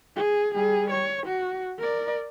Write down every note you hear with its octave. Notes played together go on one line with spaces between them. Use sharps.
G#4
G3 G#4
C#5
F#4
A#4 D5